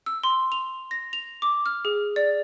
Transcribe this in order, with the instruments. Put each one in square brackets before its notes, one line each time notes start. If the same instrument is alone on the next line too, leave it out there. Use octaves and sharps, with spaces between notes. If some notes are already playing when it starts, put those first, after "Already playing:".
[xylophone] E6
C6
F7
A#6
F7
D6
F6
G#4
D5